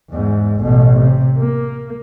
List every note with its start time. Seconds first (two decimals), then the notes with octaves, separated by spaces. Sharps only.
0.11 E2 G#2
0.62 A1 B2
0.99 C3
1.38 A#3